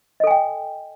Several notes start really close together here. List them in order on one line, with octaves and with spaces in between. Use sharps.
D#5 A4 G#5 G5